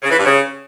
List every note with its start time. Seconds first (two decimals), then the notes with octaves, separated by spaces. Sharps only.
0.03 C#3
0.10 E3
0.18 G2
0.25 C#3